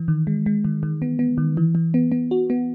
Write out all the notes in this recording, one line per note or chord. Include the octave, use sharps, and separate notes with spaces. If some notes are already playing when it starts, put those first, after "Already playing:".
Already playing: E3
D#3
G#3
G#3
D#3
D#3
B3
B3
D#3
E3
E3
B3
B3
F#4
B3